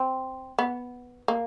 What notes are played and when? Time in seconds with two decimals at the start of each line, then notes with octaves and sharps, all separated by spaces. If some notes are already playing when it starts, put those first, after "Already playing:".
Already playing: C4
0.59 B3
1.28 A#3